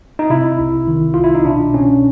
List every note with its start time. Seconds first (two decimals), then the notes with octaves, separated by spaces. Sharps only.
0.19 D#4
0.30 C3 E4
0.59 C2
0.87 D#3
1.14 C2 F4
1.24 E4
1.35 D#4
1.45 B2 D4
1.74 B2 C#4